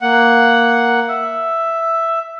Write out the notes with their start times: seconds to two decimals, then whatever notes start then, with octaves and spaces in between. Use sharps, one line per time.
0.01 A#3 F#5
1.08 E5